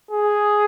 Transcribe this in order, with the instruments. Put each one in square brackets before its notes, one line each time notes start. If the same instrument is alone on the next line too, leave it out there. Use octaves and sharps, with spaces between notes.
[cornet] G#4